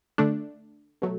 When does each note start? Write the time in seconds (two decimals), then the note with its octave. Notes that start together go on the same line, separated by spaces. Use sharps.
0.18 D3 A3 D4
1.02 B2 F#3 A3